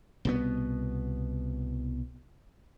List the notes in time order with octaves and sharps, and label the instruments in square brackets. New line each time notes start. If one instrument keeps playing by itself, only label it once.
[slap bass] C2 B2 B3